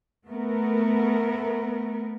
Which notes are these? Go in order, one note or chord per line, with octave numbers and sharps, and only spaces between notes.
A3 B3 A#4